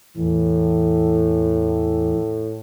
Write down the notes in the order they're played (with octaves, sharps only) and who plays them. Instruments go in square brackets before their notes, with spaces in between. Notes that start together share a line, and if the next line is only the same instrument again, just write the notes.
[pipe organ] E2 E3 [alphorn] A2